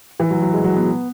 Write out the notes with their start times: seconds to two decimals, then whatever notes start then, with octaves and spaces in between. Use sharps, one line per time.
0.20 E3
0.30 F#3
0.42 F#3
0.53 G#3
0.64 F#3
0.76 B3